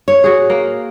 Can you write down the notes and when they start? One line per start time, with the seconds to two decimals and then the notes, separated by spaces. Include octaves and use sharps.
0.08 C#5
0.24 F#4 G#4
0.50 A#3